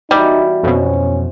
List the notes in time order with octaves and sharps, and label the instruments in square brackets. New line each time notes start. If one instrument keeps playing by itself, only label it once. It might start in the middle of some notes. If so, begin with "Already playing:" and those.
[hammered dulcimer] B2 E3 [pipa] G3 [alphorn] D#4
[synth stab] F2 B2 [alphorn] C#4 [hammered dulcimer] C5